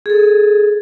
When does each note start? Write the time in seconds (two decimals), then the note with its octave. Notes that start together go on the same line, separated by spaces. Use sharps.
0.06 G#4 A4